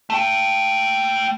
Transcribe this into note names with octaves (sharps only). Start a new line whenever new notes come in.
A3 G5